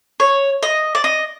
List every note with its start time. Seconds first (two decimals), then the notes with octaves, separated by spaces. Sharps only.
0.20 C#5
0.63 D#5
0.95 D5
1.04 D#5